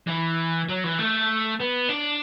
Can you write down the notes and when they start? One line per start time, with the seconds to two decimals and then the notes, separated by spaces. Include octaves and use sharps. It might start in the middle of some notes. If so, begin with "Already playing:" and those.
0.08 E3
0.69 F#3
0.84 E3
0.99 A3
1.60 B3
1.89 D4